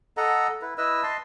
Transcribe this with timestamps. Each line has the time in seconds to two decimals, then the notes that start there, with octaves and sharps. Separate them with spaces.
0.17 A4 D#5 F#5 A#5
0.62 E4 B4
0.78 E4 B4 D#5 E6
1.03 D#5 A5 C6